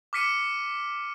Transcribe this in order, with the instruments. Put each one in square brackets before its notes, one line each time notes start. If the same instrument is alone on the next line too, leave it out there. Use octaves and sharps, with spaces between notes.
[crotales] D6 F6 B6 C#7 D#7